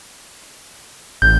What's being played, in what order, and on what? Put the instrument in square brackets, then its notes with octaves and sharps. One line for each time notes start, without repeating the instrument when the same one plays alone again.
[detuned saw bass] A1 [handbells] G6